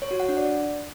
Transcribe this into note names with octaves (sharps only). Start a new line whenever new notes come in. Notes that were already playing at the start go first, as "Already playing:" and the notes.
C#5
F#4
F#5
D4
D5